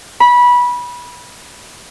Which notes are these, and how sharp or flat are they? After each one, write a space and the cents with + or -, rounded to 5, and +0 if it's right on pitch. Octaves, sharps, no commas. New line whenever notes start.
B5 -20